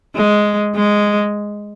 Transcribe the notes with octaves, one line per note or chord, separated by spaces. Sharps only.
G#3
G#3